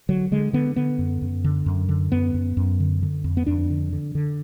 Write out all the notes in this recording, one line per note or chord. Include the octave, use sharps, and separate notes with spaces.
D3 F#3
D3 G#3
D3 B3
D3 B3
F#2
F#2
D3
F#2
D3
F#2 B3
F#2
F#2
D3
D3
F2
B3
F2 D4
D3
D3
D3